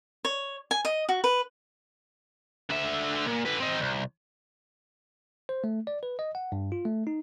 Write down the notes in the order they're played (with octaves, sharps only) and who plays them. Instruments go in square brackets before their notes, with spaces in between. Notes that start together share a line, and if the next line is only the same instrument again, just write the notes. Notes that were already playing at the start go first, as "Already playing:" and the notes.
[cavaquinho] C#5
G#5
D#5
F#4
B4
[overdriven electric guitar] D3 E5
A#2
D3 B4
C4 D#4
C2
[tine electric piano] C5
A3
D5
B4
D#5
F#5
G2
F4
A3
D#4